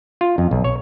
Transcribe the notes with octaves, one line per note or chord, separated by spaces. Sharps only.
F4
F2
B1
C#5